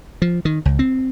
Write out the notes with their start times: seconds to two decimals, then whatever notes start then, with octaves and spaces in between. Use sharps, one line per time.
0.22 F3
0.45 D#3
0.65 C#2
0.79 C4